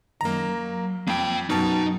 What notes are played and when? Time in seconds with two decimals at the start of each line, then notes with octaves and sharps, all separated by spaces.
0.21 F#2 D#3 A#3 A#5
0.52 F#3
1.08 F2 A#3 G5
1.50 F#2 B2 D#4 A5